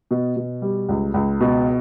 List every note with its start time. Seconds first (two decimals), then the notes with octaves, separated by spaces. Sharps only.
0.11 B2
0.37 B2
0.62 G3
0.89 C#2
1.14 C#2
1.40 B2